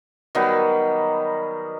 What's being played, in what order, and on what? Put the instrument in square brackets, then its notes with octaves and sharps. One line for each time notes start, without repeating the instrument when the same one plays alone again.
[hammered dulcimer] D#3 F#3 G3 B3